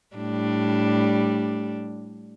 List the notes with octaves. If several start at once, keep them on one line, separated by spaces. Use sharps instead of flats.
A2 G3 D4